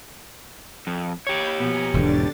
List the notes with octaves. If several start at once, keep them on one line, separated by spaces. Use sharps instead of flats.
F2
G4 C#5 B5 G6
B2 F3 B3 G#5 A#5
E1 G#2 D3 E3 D4 A6